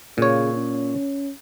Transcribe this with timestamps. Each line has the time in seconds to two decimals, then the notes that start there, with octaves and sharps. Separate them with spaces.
0.18 A#2 C#3 C#5
0.56 C#4